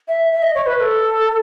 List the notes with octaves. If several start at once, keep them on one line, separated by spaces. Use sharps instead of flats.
E5
E5
D#5
C#5
B4
B4
A4